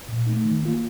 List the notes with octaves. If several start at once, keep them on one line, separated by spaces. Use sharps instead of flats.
A#2
A3 D#4
D#3
A#3 F4